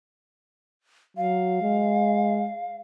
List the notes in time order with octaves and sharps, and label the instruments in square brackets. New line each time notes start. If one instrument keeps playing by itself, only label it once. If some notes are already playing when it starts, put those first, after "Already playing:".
[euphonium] F#3 [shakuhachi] F5
[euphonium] G#3